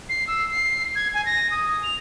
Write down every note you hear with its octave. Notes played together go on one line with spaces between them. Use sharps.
C7
E6
C7
G#6
G#5
A#6
D#6
F7